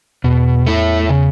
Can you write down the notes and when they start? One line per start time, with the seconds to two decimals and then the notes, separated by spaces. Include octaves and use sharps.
0.24 E2 B2
0.67 A3 E4
1.09 C#3